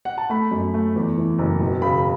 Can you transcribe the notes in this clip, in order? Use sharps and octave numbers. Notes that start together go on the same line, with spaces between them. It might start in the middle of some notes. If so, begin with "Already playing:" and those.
F#5
A5
A3 B5
F#2
A3
E2
E3
F#1
E1
C#3 B5